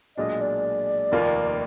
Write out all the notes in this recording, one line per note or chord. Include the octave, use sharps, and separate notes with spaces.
B1 A#2 G#3 D4 D#5
D5
F1 D#2 D#3 A#3 F4